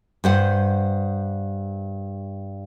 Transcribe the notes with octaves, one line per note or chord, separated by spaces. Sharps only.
G2 C5 F#5